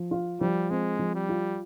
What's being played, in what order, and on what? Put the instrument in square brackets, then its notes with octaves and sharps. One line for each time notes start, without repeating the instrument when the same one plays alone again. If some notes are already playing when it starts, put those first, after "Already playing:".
Already playing: [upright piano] F3
F4
[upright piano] F3 [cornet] G3
[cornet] G#3 [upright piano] C4
[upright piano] F3
[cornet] G3
[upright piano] F4